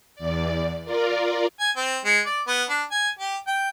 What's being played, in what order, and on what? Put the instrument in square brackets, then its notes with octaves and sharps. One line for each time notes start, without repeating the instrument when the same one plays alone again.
[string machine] E2 D5
F4 A#4 D5
[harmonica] G#5
C4
G#3
D5
B3
D4
G#5
G4
G5